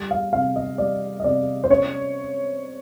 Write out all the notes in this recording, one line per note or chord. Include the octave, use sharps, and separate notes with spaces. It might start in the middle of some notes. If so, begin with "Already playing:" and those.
Already playing: G3
F5
C3 F5
D#5
G3 D5
D#5
C3 D5
C5
C#4 C#5